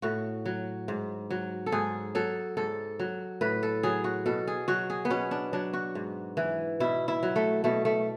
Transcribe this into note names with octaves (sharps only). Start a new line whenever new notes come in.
A2 F#4
F#3
G#2
F#3
A4
G#2 G#4
F#3 A4
G#2 A4
F#3
A2 B4
A4
F#3 G#4
F#4
B2 A4
G#4
F#3 F#4
G#4
B3
B2 C#4
D4
F#3 D4
F#4
G#2
E3
B2 E4
E4
F#3
A3
B2 A3
A3